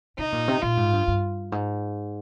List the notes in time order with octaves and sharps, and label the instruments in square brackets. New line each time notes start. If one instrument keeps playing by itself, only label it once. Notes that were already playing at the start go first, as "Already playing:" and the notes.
[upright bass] C3 [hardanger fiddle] D#4
[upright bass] A#2
C3
[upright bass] A#2 [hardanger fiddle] F4
[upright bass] G#2
G2
G2
G#2